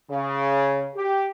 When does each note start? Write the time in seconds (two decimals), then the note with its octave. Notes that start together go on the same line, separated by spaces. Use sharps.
0.10 C#3
0.96 G4